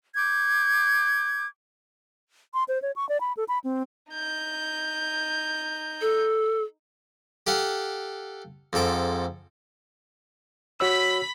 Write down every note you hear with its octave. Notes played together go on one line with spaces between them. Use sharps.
D6 G6 G#6
C6
C5
C#5
C#6
D5
B5
A4
B5
C4
D#4 G6
A4
G4 A4 F5 F#5
F2 G#2 A4 D6
F#4 C#5 B5 E6 B6